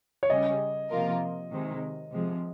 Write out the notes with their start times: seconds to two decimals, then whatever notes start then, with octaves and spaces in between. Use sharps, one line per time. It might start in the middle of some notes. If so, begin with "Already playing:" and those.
0.23 C#5
0.30 C#3 G3 C#4 D#5
0.90 C3 F3 A#3 F4 A#4
1.51 C3 D#3 G#3
2.11 C3 F3 G#3